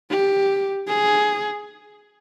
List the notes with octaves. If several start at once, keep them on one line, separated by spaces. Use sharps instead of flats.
G4
G#4